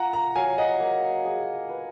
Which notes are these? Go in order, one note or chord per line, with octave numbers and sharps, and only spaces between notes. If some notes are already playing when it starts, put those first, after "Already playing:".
Already playing: F4 F#5 A#5
F#5 A#5
F#3 F5 G#5
D#5 F#5
A#3
G#4
B4